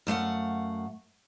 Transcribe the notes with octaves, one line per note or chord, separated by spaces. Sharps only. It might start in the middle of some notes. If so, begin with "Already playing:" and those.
F#2 A3 F5 F#5